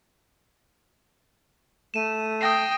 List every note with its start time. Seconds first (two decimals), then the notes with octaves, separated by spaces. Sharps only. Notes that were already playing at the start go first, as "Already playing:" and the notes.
1.94 A3 D#7 E7
2.41 G5 D#6 A#6 C7